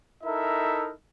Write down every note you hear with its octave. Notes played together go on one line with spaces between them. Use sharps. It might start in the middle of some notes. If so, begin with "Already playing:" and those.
D#4 E4 A4 A#4 E5